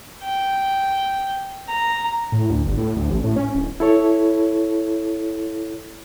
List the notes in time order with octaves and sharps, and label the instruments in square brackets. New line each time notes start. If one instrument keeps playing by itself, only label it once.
[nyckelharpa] G5
A#5
[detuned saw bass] A2
D2
G1
A2
D2
A1
A2
C#4
D1
[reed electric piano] E4 A4 C#5